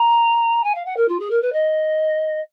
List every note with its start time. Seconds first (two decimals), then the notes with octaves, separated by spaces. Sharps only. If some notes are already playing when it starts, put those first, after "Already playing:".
Already playing: A#5
0.64 G#5
0.75 F5
0.86 F#5
0.97 A#4
1.08 F4
1.20 G#4
1.30 A#4
1.42 B4
1.53 D#5